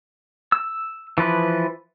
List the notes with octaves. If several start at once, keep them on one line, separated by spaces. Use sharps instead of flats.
E6
E3 F3 B4